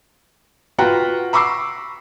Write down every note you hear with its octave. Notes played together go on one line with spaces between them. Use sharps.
F4 F#4 B4 F#5 G5 A#5
A#5 B5 C#6 D6 E6 C7